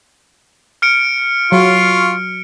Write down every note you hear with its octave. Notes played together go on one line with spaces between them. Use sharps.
F6 C#7 D7
F#3 F4 F5 C#6